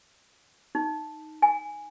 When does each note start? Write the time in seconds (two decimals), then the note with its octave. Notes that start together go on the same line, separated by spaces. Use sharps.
0.75 D#4
1.42 G#5